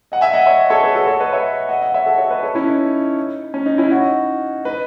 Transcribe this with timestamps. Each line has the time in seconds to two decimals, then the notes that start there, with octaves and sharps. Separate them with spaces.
0.12 D#5 F#5
0.21 E5 G#5
0.33 D#5 F#5
0.46 C#5 E5
0.70 A4 C#5
0.83 G#4 B4
0.95 F#4 A4
1.07 A4 C#5
1.20 B4 D#5
1.33 C#5 E5
1.69 D#5 F#5
1.81 D#5 F#5
1.94 C#5 E5
2.06 F#4 A4
2.18 A4 C#5
2.30 B4 D#5
2.43 A4 C#5
2.55 C#4 E4
2.68 D#4
3.54 C#4
3.66 D#4
3.78 C#4 E4
3.91 D#4 F#4
4.65 B4 D#5